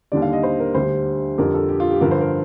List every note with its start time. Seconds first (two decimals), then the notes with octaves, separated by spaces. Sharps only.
0.12 D#2 D3 G3 D5
0.22 F5
0.33 D#5
0.43 C5
0.60 A#4
0.74 D2 D3 G3 C5
1.38 F2 D3 G3 A#4
1.54 A4
1.69 G4
1.80 F4
1.91 G4
2.01 G2 D3 F3 A#4
2.11 C5
2.20 A#4